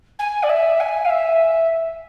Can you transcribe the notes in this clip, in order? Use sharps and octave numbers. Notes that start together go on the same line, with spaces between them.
G#5
D5
E5
G#5
F5
E5